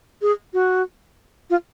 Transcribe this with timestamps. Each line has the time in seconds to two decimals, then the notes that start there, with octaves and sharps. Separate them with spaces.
0.22 G#4
0.54 F#4
1.50 F4